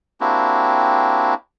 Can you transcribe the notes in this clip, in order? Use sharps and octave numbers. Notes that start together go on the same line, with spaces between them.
A#3 C4 D4 E4 F#4 G4